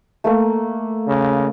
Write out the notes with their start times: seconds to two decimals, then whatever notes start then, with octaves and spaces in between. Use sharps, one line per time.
0.24 A3 A#3 A4
1.08 C#3